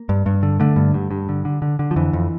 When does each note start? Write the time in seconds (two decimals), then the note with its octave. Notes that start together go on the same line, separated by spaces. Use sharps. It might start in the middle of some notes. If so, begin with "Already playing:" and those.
Already playing: A#3
0.09 G2
0.26 G2
0.43 D3
0.60 D3 A3
0.76 G2
0.94 G2
1.11 G2
1.29 D3
1.45 D3
1.62 D3
1.79 D3
1.91 F3
1.96 F2 E3
2.13 F2